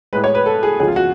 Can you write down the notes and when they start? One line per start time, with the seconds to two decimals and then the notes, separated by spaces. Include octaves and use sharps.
0.13 A2 G#3 B4
0.24 C#5
0.35 B4
0.46 A4
0.63 G#4
0.80 C#2 C#3 F3 G#3 G#4
0.88 F4
0.96 F#4